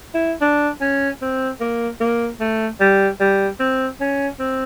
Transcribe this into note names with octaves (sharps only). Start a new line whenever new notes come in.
E4
D4
C#4
C4
A#3
A#3
A3
G3
G3
C4
C#4
C4